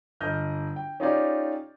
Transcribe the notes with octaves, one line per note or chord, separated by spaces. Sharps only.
G1 D#5 F6 G6
G5
C#4 D#4 F4 G4 C#5 D5